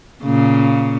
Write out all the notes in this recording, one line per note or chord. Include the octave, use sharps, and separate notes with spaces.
A#2 C#3